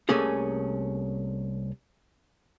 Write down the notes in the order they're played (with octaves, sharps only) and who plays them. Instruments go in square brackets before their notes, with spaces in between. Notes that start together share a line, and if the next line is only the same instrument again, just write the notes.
[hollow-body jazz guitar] C2 A3 A#3 C#4 G#4 A4